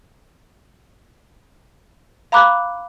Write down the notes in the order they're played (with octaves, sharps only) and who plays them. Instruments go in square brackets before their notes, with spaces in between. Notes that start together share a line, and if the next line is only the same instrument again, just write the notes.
[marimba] F5 A#5 B5 D6 F#6